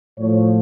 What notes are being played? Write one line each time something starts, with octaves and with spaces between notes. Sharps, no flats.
A2 F3 C#5